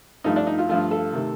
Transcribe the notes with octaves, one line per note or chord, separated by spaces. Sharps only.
G2 F3 A3 D#4
D4
D#4
F4
G2 F3 A3 F4
A4
C3 D#3 A3